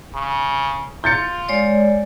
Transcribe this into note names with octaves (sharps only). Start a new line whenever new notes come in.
C#3
F4 G6 A6 C#7
G#3 C#5 D5